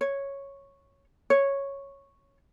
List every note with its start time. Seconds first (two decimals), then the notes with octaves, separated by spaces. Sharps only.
0.01 C#5
1.30 C#5